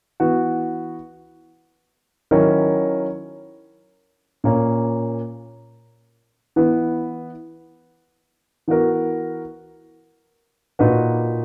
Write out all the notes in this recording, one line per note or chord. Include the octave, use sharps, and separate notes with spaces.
E3 B3 F#4
D#3 F#3 C#4 E4 A#4
A#2 A#3 C#4
E3 B3 E4
E3 B3 F#4 A#4
A#2 A#3 D#4 F#4 B4